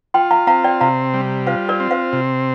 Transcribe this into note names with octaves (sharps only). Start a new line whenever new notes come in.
F4 G5 C6
F5 A#5
C4 F5 A#5
D5 G5
C3 F5 A#5
G3
F4 C5 F5
A#4 D5
C4
C5 F5
C3